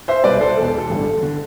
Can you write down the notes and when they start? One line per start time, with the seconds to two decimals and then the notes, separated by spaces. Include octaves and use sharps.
0.08 C5 E5
0.24 C2 B2 B4 D5
0.40 A4 C5
0.57 E1 E2 B2 A4
0.68 A4
0.78 A4
0.90 A1 G2 D3
1.23 D3